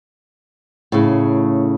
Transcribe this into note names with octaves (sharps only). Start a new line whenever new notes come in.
A2 C#3